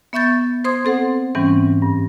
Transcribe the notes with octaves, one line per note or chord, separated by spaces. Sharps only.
B3 E5 C#6 G6 A6
C5 C6 D#6 G#6
C4 A4 C5 F#5
G#2 E3 G3 C4 C#4
G2